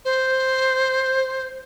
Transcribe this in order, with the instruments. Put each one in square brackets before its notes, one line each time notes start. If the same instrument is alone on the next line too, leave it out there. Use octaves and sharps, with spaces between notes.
[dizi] C5